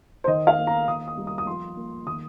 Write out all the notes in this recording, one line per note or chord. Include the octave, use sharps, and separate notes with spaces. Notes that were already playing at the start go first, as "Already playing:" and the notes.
C5
D#3 D#5
F5
A#3
A#5
D#3 D#6
D#6
G3
D#6
D#6
F3 C6
A#3
D#3 D#6